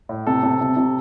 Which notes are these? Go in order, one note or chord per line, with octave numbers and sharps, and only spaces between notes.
A2
C3 A4
C3
C3
C3